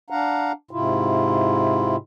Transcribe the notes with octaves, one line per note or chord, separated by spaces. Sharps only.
D4 F5 F#5 A#5
G#2 C3 E4 F4